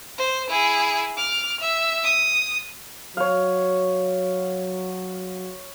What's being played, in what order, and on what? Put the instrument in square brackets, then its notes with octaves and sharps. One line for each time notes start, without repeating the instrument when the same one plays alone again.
[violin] C5
E4 G#4
D6 F6
E5
D#6
[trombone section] F#3 [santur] C#5 F5